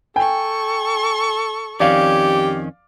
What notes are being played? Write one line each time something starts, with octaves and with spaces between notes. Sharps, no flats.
A4 G5 G#5 C#6
F2 D#3 C#4 G4 D5 F5